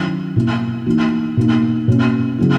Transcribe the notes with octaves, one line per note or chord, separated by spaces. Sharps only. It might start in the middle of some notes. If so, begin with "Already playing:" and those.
Already playing: D#3 F#3 C#4 E4
B2 A#3 E4
E3 A#3 D#4 F#4
B2 A#3 D#4
B2 A#3 C#4
C#3 F#3 B3 E4